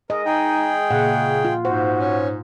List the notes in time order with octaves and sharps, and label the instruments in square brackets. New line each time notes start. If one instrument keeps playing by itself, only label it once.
[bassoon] G#3 [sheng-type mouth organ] A#4 [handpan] D#5
[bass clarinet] D#4 [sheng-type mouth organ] G#4 G5
[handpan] A#2 F#5 [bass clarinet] C#3
[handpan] F4
[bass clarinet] G#2 [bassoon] F#4 [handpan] C5
[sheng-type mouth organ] C#4